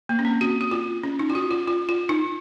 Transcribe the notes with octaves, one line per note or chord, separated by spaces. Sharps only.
A#3
C#4
C4
F#4
F#4
F4
C#4
D#4
F4
F#4
F4
F4
F4
D#4